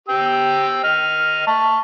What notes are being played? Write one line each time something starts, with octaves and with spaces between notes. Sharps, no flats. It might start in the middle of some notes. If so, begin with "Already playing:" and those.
G4 G5 E6
D#5 F6
A5 C#6